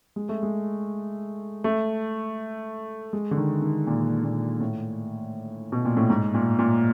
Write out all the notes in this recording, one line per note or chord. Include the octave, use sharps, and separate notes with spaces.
G#3
A3
G#3
A3
G#3
D3
D#3
D#3
A#2
A#2
A2
B2
A#2
A2
G#2
A#2
A#2